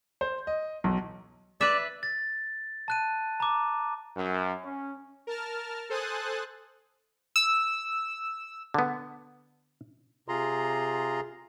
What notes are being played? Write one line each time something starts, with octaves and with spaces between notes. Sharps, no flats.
C5
D#5
B1
B4 D5 E5
A6
A5 F#6 D#7
A#5 D6
F#2
C#4
A#4 A5 F6
A4 C5 G#5 D#6 F#6 A6
E6
D3 B3
C3 F4 G#4 A#5 C6